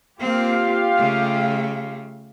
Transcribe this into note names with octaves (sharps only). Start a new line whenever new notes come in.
A#3 C4 F4 G4 F5
C#3 A3